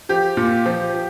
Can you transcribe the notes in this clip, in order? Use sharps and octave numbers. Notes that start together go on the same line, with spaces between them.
F3 G4
A#2
F3
F3